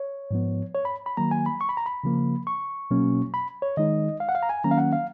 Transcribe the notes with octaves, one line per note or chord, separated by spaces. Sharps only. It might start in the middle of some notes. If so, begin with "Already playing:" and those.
Already playing: C#5
G#2 F3 B3
C#5
B5
B5
D#3 F#3 A#3 A#5
G#5
B5
C#6
B5
A#5
B5
C#3 F3 A#3
C#6
B2 F#3 A#3 C#4
B5
C#5
D#3 G#3 D#4 D#5
F5
F#5
F5
A#5
G#5
D#3 F#3 A#3 C#4 A#5
F5
F#5
F5